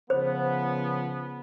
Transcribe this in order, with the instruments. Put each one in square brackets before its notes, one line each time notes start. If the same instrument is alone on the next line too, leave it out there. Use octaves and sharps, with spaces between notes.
[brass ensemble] C#3 F3 B3 [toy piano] C5